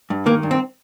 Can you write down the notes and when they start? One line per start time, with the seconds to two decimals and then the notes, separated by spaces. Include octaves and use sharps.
0.10 G2
0.26 D#3 A#3
0.43 G2
0.51 C4